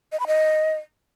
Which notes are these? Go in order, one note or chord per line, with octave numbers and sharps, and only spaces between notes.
D#5
B5
D#5